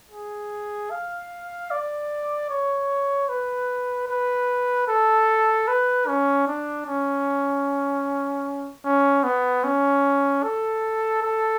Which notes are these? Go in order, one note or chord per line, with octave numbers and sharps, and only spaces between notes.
G#4
F5
D5
C#5
B4
B4
A4
B4
C#4
D4
C#4
C#4
B3
C#4
A4
A4